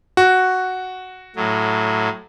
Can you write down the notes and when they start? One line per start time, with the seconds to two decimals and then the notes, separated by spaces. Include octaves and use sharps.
0.17 F#4
1.36 A2 F#3